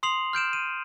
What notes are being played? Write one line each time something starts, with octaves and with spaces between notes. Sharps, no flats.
C6 D#6 C7 F7 F#7
F6 G6 D7 E7
D#7